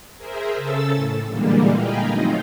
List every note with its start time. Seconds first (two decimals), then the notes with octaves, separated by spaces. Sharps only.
0.17 G#4 A#4 C5 E5
0.56 C#3 A4 E6 A6
0.95 A2
1.27 A#2 D3 E3 G3 G#3 A#3
1.76 D#5 F5 G5 G#5 A#5 B5
2.11 F3 F#3 A3 C4 D#4 F4